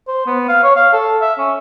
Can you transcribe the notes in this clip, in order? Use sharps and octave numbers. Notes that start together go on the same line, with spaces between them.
C5
B3
F5
C#5
F5
A4
E5
C#4